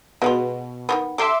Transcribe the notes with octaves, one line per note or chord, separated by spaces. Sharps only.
B2 G#3 B3 F4
D#3 A3 B3
D3 G4 E5 C6 D6